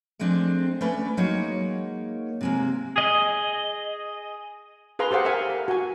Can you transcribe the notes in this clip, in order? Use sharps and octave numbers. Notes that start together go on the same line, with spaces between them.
F3 G#3 A3 C4 D4
A3 C#4 B4 D5
F#3 G#3 A#3 D#4 C#5
C3 G#3 A#3
G#4 D#5
G#4 B4 F5 A#5 C6
G4 A4 C5 F5 F#5
A#4 E5 F#5 G#5
A#4
F#4 G#5